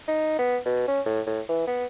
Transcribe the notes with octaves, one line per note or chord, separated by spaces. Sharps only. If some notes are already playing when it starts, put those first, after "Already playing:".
D#4
B3
B2
C#4
A2
A2
E3
B3